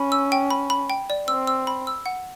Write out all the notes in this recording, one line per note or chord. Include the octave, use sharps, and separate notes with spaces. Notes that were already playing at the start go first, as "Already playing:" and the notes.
Already playing: C#4 B5
E6
G5
B5
B5
G5
D5
C4 E6
E6
B5
E6
F#5